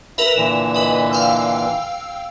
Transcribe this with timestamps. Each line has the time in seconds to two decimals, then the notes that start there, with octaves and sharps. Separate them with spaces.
0.18 A#4 B4 E5 B5
0.36 A#2 D3 E3 E7
0.74 B4 D#5
1.11 F5 G5 E6